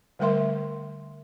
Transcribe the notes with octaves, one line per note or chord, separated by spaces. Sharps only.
D3 G3 A3 A#4 E5 C6